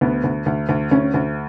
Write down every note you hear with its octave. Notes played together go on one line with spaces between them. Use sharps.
D2 B3
D2
D2
D2
D2 C#4
D2